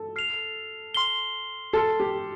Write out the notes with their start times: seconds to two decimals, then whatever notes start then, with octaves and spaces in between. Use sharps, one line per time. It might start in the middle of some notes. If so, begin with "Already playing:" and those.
Already playing: A4
0.16 F6 C7 F7
0.94 C6 F6 C7 G7
1.73 A4 C6 F6 C7
2.00 G4